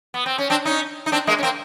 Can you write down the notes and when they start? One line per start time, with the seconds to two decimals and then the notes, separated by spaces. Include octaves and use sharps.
0.14 B3
0.26 C4
0.38 C#4
0.50 C4 D4
0.65 C#4 D#4
1.06 D#4
1.12 C4 D4
1.27 G#3 A#3
1.39 C#4
1.43 A#3 C4